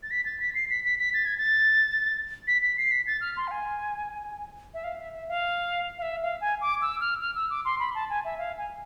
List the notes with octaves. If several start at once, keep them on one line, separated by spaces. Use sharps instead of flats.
A6
B6
A6
B6
C7
B6
B6
B6
A6
G#6
A6
B6
B6
C7
B6
A6
F6
C6
F5
G#5
E5
F5
E5
E5
F5
F5
E5
F5
G#5
D6
E6
F6
F6
E6
D6
C6
B5
A5
G#5
E5
F5
G#5